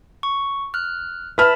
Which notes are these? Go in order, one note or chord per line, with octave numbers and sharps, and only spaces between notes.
C#6
F6 F#6
B4 E5 A5 B5 F6